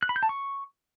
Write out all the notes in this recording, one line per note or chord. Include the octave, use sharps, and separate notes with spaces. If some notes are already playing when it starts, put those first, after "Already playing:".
F#6
B5
G6
A5
C#6